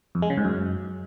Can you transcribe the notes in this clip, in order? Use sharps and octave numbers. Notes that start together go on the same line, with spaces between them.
F2
G#3
C#3
G#2
F#2